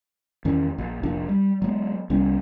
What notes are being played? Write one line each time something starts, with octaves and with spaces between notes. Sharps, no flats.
E2 D#3 C#4
A#1
F1 A#1 F3 D4
G3
F#3 G#3 B3
C2 G3 B3 C#4